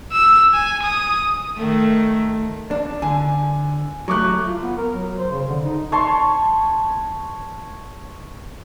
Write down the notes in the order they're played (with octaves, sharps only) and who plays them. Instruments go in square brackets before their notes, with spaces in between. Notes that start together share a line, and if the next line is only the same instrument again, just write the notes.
[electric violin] E6
G#5
D#6
[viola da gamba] D#3 A3
[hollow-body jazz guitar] D4
[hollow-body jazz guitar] D3 [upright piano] G#5
[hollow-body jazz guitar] F#3 A3 [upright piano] C#6 D6 F#6
[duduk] F4
B3
A#4
F#3
C5
C#3
D3
D#4
[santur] C#5 A5 C6 C#6